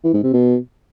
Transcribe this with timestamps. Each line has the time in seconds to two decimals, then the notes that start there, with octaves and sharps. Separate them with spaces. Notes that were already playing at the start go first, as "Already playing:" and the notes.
0.04 E3
0.14 G#2
0.24 C3
0.33 B2